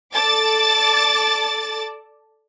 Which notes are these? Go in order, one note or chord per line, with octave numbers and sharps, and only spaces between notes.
A4 D5 A5 D6 A6